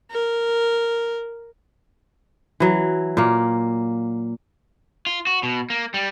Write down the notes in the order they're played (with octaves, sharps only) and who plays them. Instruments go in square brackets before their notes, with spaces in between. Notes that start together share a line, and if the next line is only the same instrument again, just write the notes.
[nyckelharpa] A#4
[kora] E3 F#3
A#2 A#3
[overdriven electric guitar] F4
F#4
B2
A#3
G3